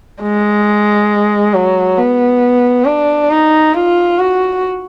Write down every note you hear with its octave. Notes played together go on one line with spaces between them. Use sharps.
G#3
F#3
B3
D4
D#4
F4
F#4